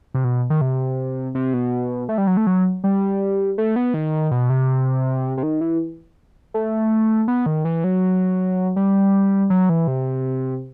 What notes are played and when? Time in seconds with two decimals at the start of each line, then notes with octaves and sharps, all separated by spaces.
0.14 C3
0.24 B2
0.50 D#3
0.61 C3
1.35 C3
1.54 B2
2.09 A3
2.18 G3
2.27 F#3
2.37 A3
2.47 F#3
2.84 G3
3.58 A3
3.76 B3
3.94 D#3
4.31 B2
4.50 C3
5.38 C3
5.43 D#3
5.61 E3
6.54 A3
7.28 B3
7.46 D#3
7.65 E3
7.84 F#3
8.76 G3
9.50 F#3
9.69 E3
9.88 C3